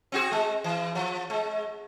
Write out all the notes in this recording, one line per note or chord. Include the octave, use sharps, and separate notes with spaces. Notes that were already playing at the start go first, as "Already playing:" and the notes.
C4 F#4 G#4
G#3
E3
F3
G#3